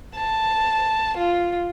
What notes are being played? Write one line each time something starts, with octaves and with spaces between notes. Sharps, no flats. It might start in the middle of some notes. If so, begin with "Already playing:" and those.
A5
F4